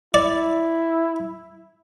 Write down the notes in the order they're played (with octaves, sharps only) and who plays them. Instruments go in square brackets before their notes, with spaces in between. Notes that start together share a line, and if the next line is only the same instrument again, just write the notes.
[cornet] E4 [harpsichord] D5